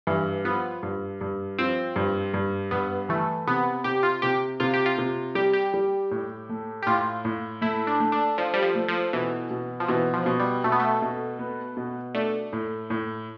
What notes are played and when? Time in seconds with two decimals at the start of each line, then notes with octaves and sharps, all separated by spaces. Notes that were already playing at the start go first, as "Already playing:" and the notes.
0.07 G2 E3
0.45 F3 B3
0.83 G2
1.21 G2
1.59 F3 C4
1.96 G2
2.34 G2
2.71 G2 B3
3.09 E3 A3
3.47 C3 B3
3.84 C3 G4
4.03 F4
4.22 C3 G4
4.60 C3 F4
4.74 G4
4.86 F4
4.98 C3
5.35 G3 G4
5.53 G4
5.74 G3
6.11 A2
6.49 A3
6.82 G4
6.87 A2 F4
7.25 A2
7.62 A3 E4
7.87 D4
8.00 A3
8.12 D4
8.38 F3 D4
8.54 G3
8.62 F3
8.75 A3
8.88 F3
9.13 B2 E3
9.51 B2
9.80 F3
9.88 B2 E3
10.14 F3
10.26 B2
10.39 G3
10.64 B2 A3
10.72 B3
10.80 A3
11.02 B2
11.39 B3
11.77 B2
12.15 A3 D4
12.53 A2
12.90 A2